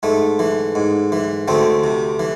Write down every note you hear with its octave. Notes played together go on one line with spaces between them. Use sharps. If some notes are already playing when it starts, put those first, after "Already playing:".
G#2 A3
E3
G#2
E3
D2 A3 C4
C3
E3